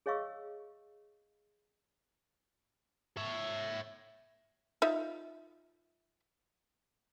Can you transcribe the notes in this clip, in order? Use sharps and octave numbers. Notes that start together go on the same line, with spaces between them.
G#4 C#5 D#5 F5 C#6 E6
C#5 E5
D#4 F4 E5